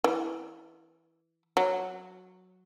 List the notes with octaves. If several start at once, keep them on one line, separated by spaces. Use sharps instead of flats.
E3
F#3